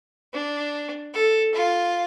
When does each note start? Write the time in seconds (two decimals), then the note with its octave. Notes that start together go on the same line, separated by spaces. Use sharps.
0.33 D4
1.14 A4
1.54 F4